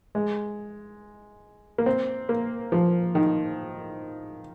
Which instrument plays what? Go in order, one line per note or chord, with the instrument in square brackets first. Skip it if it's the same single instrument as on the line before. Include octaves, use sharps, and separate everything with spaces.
[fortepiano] G#3
A#3
C4
A#3
F3
D#3